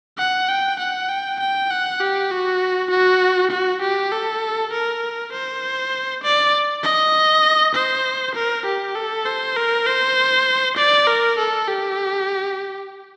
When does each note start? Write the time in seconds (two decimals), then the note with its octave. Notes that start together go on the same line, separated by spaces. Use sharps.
0.18 F#5
0.48 G5
0.79 F#5
1.09 G5
1.40 G5
1.70 F#5
2.00 G4
2.31 F#4
2.90 F#4
3.51 F#4
3.82 G4
4.12 A4
4.72 A#4
5.32 C5
6.23 D5
6.84 D#5
7.75 C5
8.35 A#4
8.66 G4
8.95 A4
9.26 C5
9.56 A#4
9.86 C5
10.77 D5
11.07 A#4
11.38 A4
11.68 G4